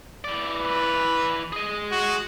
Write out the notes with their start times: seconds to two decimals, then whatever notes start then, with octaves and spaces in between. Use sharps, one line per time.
0.24 E3 D5
0.59 B4
1.52 G#4 D#5
1.91 F#4